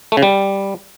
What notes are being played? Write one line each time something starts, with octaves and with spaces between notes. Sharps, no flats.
A3
C#3
G3